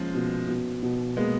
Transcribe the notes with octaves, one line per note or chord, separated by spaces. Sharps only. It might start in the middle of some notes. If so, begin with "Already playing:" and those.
Already playing: F3 G#3 A#3 C#4
B2
B2
B2
G#3 A#3 B3